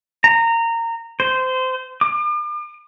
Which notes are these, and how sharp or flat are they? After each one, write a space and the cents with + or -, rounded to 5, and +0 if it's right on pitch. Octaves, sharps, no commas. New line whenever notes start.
A#5 -20
C5 -20
D6 +40